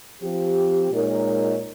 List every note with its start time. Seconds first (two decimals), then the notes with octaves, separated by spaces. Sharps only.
0.20 F3 C4 G4
0.90 A#2 G#3 D#4 A#4 C#5